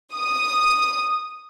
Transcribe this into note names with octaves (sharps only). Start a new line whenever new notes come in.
D#6